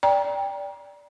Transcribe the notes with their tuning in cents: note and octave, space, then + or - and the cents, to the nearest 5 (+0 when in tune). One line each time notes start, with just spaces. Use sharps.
D5 -15 G5 +15 A#5 +25